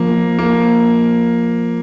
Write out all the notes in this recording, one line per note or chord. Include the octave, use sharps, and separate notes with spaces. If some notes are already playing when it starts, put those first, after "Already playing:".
Already playing: F3 A#3
A#3